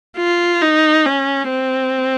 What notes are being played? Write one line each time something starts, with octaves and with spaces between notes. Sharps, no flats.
F4
D#4
C#4
C4